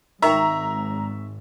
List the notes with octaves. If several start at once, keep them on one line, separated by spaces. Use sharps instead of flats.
G#1 G#2 D#4 A#4 E5 G5 A#5 C#6